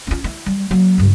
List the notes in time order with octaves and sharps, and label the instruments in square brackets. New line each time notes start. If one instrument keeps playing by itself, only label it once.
[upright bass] C#4 F4
E4
G3
F#3 A#3
C#2 G2